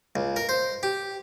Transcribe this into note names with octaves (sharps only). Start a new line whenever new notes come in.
C#2
A#4
C5
G4